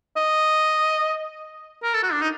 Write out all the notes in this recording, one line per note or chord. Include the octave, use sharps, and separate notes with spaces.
D#5
A#4
A4
F#4
D4
D#4